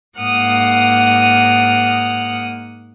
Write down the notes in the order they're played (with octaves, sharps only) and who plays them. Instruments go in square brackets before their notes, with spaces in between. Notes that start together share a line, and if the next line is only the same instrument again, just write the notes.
[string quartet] G#2 A#3 F#5 D#6 F6